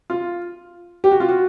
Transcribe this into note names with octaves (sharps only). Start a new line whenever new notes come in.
F4
G4
F#4
F4
F#4